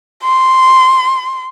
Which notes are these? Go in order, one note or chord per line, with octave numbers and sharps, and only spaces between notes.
C6